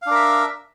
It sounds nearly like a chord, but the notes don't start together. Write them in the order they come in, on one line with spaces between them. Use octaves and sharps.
F5 D4 A#4 E5